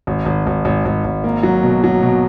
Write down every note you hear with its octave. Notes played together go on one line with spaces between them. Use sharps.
G#1
G#1
G#1
G#1
G#1
G#1
A#3
F#3
B2
F#3
B2